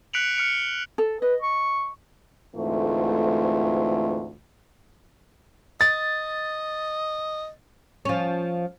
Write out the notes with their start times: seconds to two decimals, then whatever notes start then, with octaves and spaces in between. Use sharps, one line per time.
0.13 F#6 B6 C#7 D7 F7 F#7
0.36 F6 C#7 D7 F7
0.98 A4
1.22 B4 D#5
1.42 C#6
2.56 D2 G#2 E3 A3 C4 F4
5.81 D#5 A6
8.05 F3 C#4